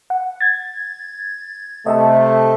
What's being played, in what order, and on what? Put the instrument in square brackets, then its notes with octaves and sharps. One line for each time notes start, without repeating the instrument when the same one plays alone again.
[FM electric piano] F#5
G#6 A6
[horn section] C3 A3 [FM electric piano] D#5 E5 A5